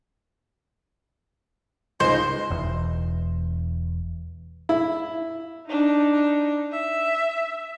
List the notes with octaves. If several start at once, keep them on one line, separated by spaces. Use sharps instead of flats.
C#2 G#2 C5 D#5
E1 E2
E4
D4 D#4
E5